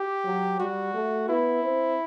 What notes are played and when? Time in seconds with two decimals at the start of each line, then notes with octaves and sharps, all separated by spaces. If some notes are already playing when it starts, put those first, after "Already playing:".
Already playing: G4
0.25 F#3
0.60 G3 F#4
0.94 A3
1.28 B3 E4
1.63 C4